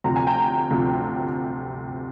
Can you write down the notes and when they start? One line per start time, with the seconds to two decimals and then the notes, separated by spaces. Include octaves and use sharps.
0.04 D2 C3 F3 A#5
0.16 G#5
0.27 G5 A#5
0.71 D2 C3 F3